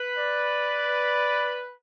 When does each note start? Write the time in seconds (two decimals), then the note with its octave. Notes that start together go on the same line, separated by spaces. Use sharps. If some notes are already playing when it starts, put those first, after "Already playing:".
Already playing: B4
0.18 D5